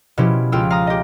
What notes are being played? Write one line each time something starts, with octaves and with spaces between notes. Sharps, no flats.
B2 F3 C#4 E4 G4
C#2 F4 G5 E6
F5 A#5 D#6
G4 D#5